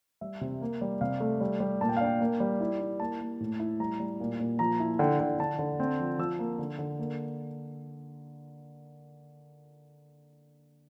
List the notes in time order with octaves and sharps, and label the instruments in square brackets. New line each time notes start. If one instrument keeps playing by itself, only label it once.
[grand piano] G3 E5
C3
A#3
G3
C3 F5
A3
G3
G3
A#2 A5
G5
F5
D4 G5
A#3
G3
E4
E4
A#3 A5
A#3
A2
E4
G3 A#5
G3
A#2
A#2
F3 A#5
E4
D3 G5
D3
D3 A5
D3
C4
F3
F3 E6
A#3
D3
D3
A#3